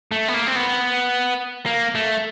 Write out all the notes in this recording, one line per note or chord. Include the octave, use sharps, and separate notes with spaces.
A3
B3
A#3
C4
B3
A#3
A3